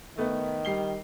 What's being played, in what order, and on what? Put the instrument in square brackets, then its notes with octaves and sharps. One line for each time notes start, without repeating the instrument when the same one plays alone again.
[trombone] D#3 [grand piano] A3 B3
[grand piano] G3 C7 G7